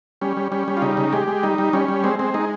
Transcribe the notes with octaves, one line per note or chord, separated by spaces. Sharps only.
G3 C#4
G3
G3 C#4
G3
F4
C#3 D#4
C#3
G#3 G4
G#3
G3 D#4
G3
G3 C#4
G3
G#3 C4
G#3 C4
G#3 D#4